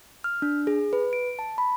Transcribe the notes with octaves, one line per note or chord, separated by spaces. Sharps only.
F6
D4
G#4
B4
D7
A5
B5